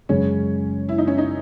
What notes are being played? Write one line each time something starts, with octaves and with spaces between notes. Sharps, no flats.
F#2 C#3 G#3 C#4
E4
D#4
C#4
D#4